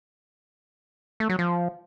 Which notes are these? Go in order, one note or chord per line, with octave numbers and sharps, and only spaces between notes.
A3
F#3
F3